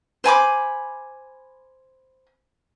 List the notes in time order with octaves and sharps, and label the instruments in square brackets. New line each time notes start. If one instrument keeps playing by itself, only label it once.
[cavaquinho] C5 G#5 B5 D6